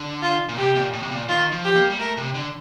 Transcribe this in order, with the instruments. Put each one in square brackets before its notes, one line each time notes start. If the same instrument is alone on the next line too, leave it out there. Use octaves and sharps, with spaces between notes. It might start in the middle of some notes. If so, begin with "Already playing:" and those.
Already playing: [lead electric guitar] D3
[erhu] F4
[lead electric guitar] A#2
[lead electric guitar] C3 [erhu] G4
[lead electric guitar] A#2
A2
C3
A#2
[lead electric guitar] D#3 [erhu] F4
[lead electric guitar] F3
[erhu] G4
[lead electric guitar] A#3
G3
[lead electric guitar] A3 [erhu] A#4
[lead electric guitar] C3
D3